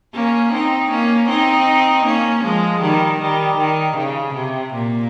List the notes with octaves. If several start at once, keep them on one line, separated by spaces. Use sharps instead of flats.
A#3 C#4
C4 D#4
A#3 C#4
C4 D#4
A#3 C#4
F3 G#3
D#3 G3
D#3 G3
D#3
C#3
C3
A#2